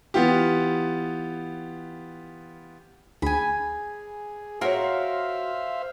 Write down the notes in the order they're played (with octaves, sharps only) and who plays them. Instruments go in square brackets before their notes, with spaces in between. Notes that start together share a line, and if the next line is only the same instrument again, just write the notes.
[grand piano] E3 B3 F4 G4
[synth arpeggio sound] D2 [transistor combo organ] G#4 [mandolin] G#5 B5
[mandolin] F4 A#4 [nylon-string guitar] F#4 C#5 [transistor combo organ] C5 E5 F5